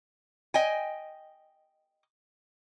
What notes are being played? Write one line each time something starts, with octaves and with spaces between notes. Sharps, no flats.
D#5 G5 G#5